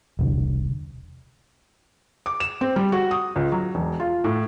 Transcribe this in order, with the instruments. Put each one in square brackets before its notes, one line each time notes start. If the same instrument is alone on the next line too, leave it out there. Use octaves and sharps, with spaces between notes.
[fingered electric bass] E1 C2 D3
[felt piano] D6
E7
C4
G3
F#4
D#6
C#2
F#3
E1
F4
A2